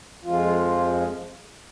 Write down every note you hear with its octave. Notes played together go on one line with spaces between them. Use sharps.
F2 F3 G#3 F4